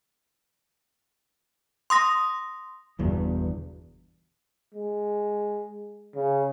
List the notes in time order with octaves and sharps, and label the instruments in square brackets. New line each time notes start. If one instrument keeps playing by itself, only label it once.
[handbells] C6 D#6 A#6
[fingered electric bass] G1 E2 G2 B2
[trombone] G#3
C#3